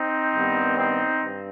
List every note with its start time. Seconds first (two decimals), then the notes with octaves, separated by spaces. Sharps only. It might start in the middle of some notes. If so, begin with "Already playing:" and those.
Already playing: C4 D#4
0.33 G2 D#3 G3 B3
0.77 C4 D#4
1.21 G2